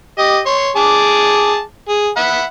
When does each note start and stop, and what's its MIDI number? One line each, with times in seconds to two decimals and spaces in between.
0.18 0.40 67
0.18 0.40 75
0.46 0.70 73
0.46 0.70 84
0.76 1.61 68
0.76 1.61 81
0.76 1.61 86
1.89 2.09 68
2.17 2.44 76
2.17 2.44 78
2.17 2.44 83